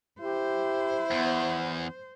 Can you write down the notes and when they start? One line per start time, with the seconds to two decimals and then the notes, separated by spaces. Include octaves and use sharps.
0.21 E4 G4 C5
1.11 E2 B3